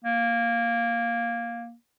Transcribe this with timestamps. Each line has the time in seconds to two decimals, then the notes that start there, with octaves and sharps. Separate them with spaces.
0.05 A#3